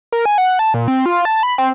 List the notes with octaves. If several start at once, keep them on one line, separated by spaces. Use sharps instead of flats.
A#4
G#5
F#5
A5
A#2
C4
F4
A5
B5
C4